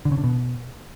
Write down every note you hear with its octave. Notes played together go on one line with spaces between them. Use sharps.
D3
C#3
D3
B2